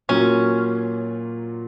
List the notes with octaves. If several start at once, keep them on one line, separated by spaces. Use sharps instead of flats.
A#2 F#3 A#3 C#4 F4